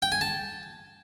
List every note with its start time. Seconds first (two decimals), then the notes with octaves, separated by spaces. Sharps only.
0.02 G5
0.12 G#5
0.21 A5